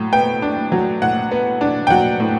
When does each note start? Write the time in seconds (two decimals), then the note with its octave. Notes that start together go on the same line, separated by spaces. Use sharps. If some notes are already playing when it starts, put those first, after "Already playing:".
Already playing: A2 F#3
0.13 B3 G5
0.42 D4
0.72 F#3
1.02 A2 F#5
1.31 B3
1.61 D4
1.87 G5
1.90 F#3 F#5
2.20 A2